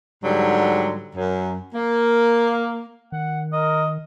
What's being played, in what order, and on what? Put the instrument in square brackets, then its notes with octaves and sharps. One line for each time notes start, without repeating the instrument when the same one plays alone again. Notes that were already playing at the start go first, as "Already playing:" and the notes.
[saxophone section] G#2 D3 F#3 G3
F#2
A#3
[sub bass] D#3 [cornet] F#5
[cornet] A#4 [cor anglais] D#5